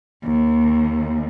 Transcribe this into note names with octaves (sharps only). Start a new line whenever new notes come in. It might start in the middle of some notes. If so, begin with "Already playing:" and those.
D#2